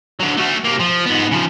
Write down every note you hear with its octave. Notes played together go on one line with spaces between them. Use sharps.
D3 F#3
A3 F#4
C3 A#3
F3
G#2 B3
C#3 F3